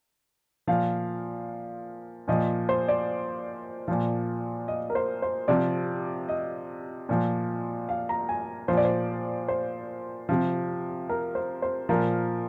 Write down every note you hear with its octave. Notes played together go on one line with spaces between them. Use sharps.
A#2 F3 F5
A#2 F3 D#5
C5
D5
A#2 F3
D#5
A#4
C5
C5
C3 F3 D5
D#5
A#2 F3
F5
A#5
G#5
A#2 F3 C5
D5
C5
C5
C3 F3
A#4
C5
C5
A#2 F3 A#4